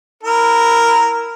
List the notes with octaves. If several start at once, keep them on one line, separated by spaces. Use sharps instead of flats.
E4 A#4